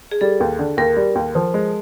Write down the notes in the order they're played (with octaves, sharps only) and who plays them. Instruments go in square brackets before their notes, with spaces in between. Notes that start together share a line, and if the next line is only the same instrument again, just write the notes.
[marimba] G#4
[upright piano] G3 [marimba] A4
[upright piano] D#2
D3
[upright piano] D#2 [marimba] A#4
[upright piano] G3
D#2
F3
G#3